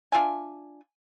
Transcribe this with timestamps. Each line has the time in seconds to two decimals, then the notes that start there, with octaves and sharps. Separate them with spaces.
0.12 D4 F4 E5 G#5